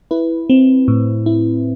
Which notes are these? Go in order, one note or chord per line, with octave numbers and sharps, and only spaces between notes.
E4 B4
C4
A2
E4